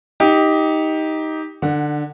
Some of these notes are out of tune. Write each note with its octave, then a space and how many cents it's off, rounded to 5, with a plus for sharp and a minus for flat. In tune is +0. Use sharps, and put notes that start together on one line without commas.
D#4 +15 G4 +0
D3 +20 F#5 -15